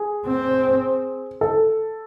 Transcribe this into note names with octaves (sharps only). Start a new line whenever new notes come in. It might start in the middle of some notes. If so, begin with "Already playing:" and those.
Already playing: G#4
C4
A4